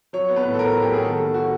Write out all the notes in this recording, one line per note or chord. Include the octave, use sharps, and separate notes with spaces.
F#3 C#5
B3
B4
A2
A4
A2 A#4
F#3
G4
B3 G#4
D#3 A4
G3
F#4